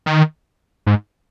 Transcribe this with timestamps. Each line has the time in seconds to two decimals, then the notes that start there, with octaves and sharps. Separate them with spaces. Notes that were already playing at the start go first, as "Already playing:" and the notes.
0.06 D#3
0.87 G#2